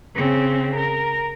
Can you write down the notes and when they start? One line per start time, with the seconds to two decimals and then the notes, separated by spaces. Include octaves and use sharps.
0.16 C#3 C4
0.76 A#4